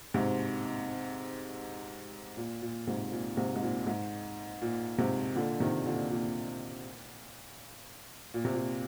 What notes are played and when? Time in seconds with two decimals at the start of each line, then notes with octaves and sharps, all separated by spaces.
0.14 G#2 C3
2.37 A#2
2.62 A#2
2.87 G#2 C3
3.12 A#2
3.37 G#2 C3
3.55 G#2
3.62 A#2
3.86 G#2
4.62 A#2
4.98 G#2 C3
5.35 A#2 D3
5.60 C3 D#3
5.86 A#2 D3
6.11 A#2
8.34 A#2
8.45 C3
8.54 A#2